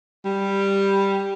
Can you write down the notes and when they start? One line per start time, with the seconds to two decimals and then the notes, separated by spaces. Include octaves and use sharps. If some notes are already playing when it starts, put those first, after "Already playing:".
0.25 G3